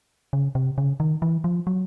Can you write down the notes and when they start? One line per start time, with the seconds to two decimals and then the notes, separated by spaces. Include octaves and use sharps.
0.33 C#3
0.55 C3
0.78 C#3
1.00 D#3
1.22 E3
1.44 F3
1.67 F#3